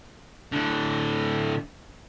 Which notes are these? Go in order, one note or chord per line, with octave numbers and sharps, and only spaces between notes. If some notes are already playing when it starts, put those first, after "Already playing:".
A2 D3